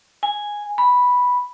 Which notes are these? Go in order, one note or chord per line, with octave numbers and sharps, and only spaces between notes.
G#5
B5